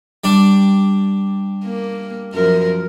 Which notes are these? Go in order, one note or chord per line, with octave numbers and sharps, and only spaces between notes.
G3 D4
A#3
F#2 F3 A#4